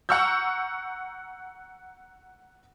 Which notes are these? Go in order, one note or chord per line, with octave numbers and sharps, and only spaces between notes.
F#5 A#5 C#6 E6 F6 G6